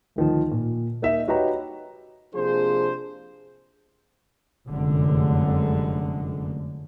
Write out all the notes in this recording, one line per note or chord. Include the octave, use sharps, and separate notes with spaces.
D2 D#3 F3
A#2
A#3 D#4 D#5 E5
D#4 F#4 G4 B4 C#5 A#5
C3 F3 A#3 D4 G#4 C5
F1 F#2 D3 G#3